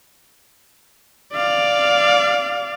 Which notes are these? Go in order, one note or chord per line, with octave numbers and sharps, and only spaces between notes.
D5 F5